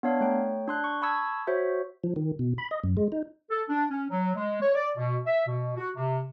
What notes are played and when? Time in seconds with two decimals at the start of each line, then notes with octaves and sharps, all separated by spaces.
0.03 B3 D4 C#5 F5
0.21 A3 C#5 G5
0.68 D4 C6 F#6
0.84 C#6
1.02 A5 B5 C#6 D#6 E6 G#6
1.47 F#4 C5 C#5 E5
2.04 F3
2.16 D#3
2.39 B2
2.58 B5
2.71 D#5
2.84 F#2
2.97 G#3
3.12 D#4
3.50 A4
3.69 D4
3.90 C#4
4.10 F#3
4.36 G#3
4.62 C#5
4.75 D5
4.97 B2
5.26 E5
5.47 B2
5.77 F#4
5.96 C3